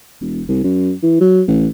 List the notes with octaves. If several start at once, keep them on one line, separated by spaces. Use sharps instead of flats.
E1
C2
F#2
E3
F#3
A1